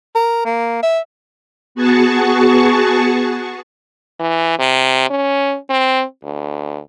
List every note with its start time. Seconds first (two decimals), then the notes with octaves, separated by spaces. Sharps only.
0.15 A#4
0.45 A#3
0.83 E5
1.75 B3 F#4 G#4 A5 C#6
4.20 E3
4.59 C3
5.10 C#4
5.70 C4
6.24 D2